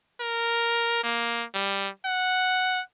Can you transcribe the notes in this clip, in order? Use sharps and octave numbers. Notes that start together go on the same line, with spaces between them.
A#4
A#3
G3
F#5